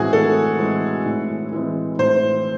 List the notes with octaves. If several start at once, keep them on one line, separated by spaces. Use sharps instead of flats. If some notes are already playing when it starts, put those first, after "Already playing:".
Already playing: A2 E3 G#3 C4 F#4 G#4
A2 A4
E3 G#3 C4
A2
E3 G#3 C4
A2 C5